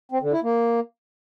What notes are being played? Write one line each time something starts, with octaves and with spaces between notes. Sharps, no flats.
C4
D3
E4
A#3